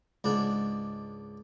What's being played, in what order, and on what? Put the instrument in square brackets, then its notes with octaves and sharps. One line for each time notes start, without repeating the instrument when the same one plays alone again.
[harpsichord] C#2 G#2 D4